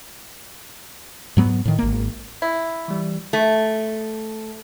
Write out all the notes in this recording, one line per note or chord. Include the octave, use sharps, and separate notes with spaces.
G#2 F#3 B3
A2 D#3
G#1 A#3
E4
E3 G3
A3